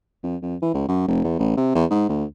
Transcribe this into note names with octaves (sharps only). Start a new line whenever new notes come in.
F2
F2
E3
C#2
F#2
F1
E2
A1
C3
E2
G#2
D2